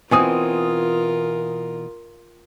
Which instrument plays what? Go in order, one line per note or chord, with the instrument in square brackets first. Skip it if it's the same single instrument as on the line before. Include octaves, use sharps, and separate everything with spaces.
[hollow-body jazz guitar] B2 E3 C4 [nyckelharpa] F4 A#4 [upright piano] G#5 D#6